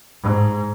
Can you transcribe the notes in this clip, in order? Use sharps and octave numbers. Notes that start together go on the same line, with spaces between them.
G#2